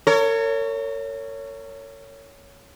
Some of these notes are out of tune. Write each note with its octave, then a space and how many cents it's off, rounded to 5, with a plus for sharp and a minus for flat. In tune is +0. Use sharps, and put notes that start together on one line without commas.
A#4 -40 C#5 +10